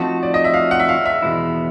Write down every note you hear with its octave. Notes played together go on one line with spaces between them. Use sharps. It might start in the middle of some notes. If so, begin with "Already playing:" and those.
Already playing: F3 A3 C4 D#4 F#4 A5
D5
D#5
E5
F5
F#5
E5
F5
E5
E2 B2 G#3 B3 E4